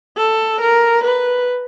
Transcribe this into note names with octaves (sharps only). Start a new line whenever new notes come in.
A4
A#4
B4